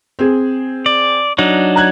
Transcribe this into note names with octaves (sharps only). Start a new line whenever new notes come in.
C4 G#4
D5
F#3 D4 D#4
A#5 F#6 G#6